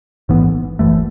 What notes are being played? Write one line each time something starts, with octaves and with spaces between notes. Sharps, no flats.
A1 G#2 E3 B3
F#1 F#2 E3 A3